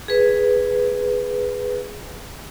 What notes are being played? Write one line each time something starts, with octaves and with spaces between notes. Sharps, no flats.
G#4 B4